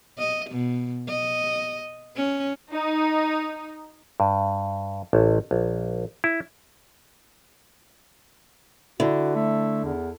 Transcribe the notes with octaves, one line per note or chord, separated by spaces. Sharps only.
D#5
B2
D#5
C#4
D#4
G2
A1
A#1
E4
D3 E4 F#4
A3
E2